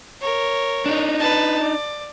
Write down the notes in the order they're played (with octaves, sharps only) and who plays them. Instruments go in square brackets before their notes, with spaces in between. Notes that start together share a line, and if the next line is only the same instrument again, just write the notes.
[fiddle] A#4 C#5
[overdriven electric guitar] D4 D#4
[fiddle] B4 A5
D5